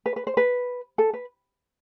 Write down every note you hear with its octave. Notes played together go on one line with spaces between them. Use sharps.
B4
B4
C5
B4
A4
B4